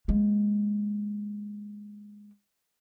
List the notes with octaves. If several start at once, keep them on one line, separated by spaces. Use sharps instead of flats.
G#3 A#3